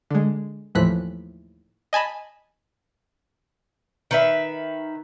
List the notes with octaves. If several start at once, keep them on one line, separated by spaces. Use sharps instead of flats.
D3 G#3
D#2 A2 E3 F3 F#6 B6
D#5 G#5 A5 B5
D#3 B4 E5